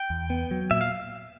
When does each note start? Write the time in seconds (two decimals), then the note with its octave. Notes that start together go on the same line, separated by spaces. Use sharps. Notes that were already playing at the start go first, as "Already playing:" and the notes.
Already playing: G5
0.10 E2
0.30 B3
0.51 F#3
0.71 A#2 E5
0.81 F5